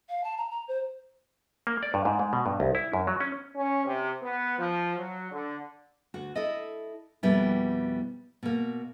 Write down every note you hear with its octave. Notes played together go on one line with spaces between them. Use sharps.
F5
A5
A#5
A#5
C5
A#3
D5
G2
G#2
G#2
B2
G2
C2
E4
F#2
F#3
C#4
C#4
C3
B3
F3
F#3
D3
D2 F#4
E4 A4 D#5
F2 B2 G3 A#3 B3 E4
B2 A#3